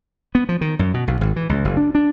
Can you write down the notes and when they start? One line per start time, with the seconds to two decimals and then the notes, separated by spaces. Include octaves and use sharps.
0.35 B3
0.49 F3
0.61 D#3
0.79 F#2
0.94 B2
1.07 B1
1.21 G#1
1.36 E3
1.49 C#2
1.65 F#1
1.77 D4
1.95 D4